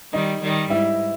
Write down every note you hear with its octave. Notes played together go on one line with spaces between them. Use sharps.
D#3 G3 D#4 D#5
D#3 G3
G#2 E4 E5